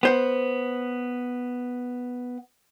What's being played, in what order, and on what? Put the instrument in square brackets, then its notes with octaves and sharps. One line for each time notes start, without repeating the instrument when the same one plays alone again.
[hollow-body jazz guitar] B3 C5 F#5